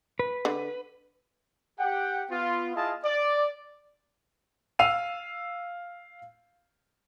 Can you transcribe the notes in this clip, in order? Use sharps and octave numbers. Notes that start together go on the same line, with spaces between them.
B4
D3
G4 F#5 G5
B3 F4
E4 F4 G#4 D#5 F5 A5
D5
F5 E6 C7 D#7 F7